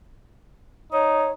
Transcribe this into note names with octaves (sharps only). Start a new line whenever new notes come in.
D#4 C#5